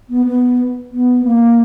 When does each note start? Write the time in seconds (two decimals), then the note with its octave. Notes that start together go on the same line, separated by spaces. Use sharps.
0.10 B3
0.26 B3
0.92 B3
1.24 A#3